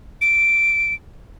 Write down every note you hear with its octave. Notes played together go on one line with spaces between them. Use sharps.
D7